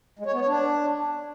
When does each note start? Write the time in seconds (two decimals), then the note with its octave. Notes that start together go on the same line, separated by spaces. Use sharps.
0.19 G#3
0.26 C#5
0.33 B3
0.40 C#5
0.47 D4